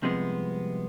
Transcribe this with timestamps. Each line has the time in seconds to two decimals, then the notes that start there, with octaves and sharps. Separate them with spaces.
0.02 C2 C3 F3 G#3 B3